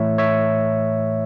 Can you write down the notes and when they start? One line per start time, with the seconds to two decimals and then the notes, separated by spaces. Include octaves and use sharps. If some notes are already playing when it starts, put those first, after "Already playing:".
Already playing: A2 E3 A3 C#5 E5
0.18 C#5 E5